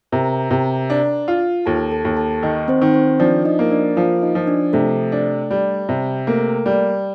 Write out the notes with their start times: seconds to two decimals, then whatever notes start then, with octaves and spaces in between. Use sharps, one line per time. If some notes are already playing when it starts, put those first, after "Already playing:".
0.12 C3 A#4 A#5
0.51 C3
0.90 D4
1.28 F4
1.66 D#2 A4 A5
1.92 A4 A5
2.05 D#2
2.17 A4 A5
2.43 D#3 D#4 D#5
2.68 C4 C5
2.82 D#3
2.94 C4 C5
3.20 F3 D4 D5
3.45 D#4 D#5
3.59 A#3
3.71 D4 D5
3.96 F3 F4 F5
4.22 D#4 D#5
4.35 F3
4.47 D4 D5
4.73 C3 A3 A4
5.12 D4
5.51 G3
5.89 C3
6.27 A3 A#3 A4
6.66 G3